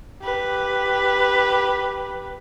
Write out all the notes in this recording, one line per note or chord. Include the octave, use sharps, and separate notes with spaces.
G4 B4